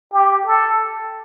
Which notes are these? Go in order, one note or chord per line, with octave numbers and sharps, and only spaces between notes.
G4
A4